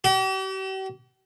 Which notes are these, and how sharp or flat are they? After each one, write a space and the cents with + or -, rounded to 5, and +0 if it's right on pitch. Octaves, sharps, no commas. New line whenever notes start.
G4 -45